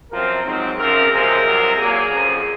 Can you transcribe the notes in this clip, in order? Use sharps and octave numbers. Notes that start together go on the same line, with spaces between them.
F#2 F3 C4 A#4
G#2 F#3 C4
F#2 C#3 F3 C4 A#4
C#2 C3 F3 G#3 C4 A#4
C2 C3 F#3
A#2 F#3 A#3 G#4
F2 C#3 F3